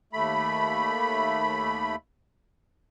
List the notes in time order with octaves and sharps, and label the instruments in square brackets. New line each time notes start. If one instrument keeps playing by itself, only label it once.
[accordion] D#2 A3 B5